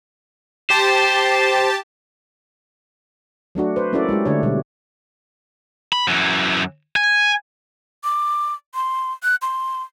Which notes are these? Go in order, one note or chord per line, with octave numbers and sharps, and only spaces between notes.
G4 C5 A5
F#3 A3 D4 F#4
B4 C5
A#3 C#4 E4 F#4 A4 D5
G#3 E4 G4
D3 A3 D4 C#5
B2 G3
B5
F#2 E3
G#5
D6
C6
F#6
C6